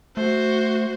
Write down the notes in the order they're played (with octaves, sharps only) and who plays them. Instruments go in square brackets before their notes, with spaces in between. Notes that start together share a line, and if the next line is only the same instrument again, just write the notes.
[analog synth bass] A3 [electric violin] F#4 C5